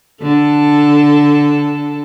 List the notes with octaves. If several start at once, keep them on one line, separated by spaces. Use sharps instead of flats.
D3 A4